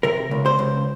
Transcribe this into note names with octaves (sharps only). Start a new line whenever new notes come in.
C3 A#4
C#2
C5
C#2